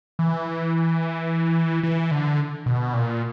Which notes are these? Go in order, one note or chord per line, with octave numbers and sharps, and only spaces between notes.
E3
E3
D3
B2
A#2